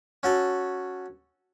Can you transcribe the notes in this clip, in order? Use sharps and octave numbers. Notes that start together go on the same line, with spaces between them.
C#4 F#4 A4